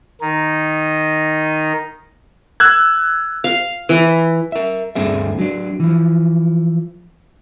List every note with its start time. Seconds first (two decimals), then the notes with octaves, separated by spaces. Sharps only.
0.21 D#3 D#4
2.60 E6 F#6 G#6
3.44 F5
3.89 E3
4.52 A#4 E5
4.95 D2 G2 D3 C4 G#4 E5
5.39 F#3 D4
5.80 E3 F3